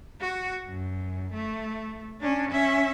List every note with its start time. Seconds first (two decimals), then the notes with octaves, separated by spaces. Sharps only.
0.20 F#4
0.68 F#2
1.34 A3
2.20 C#4 D4
2.51 C#4 E5